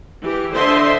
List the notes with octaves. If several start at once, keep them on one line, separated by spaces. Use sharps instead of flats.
E3 G4
D3 C5 D#5 E5 C6